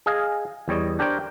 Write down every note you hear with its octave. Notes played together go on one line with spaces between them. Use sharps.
G#4 D#5 F5 G#5
E2 G3 C#5 D#5
D4 G4 A#4 C5 C#5 G5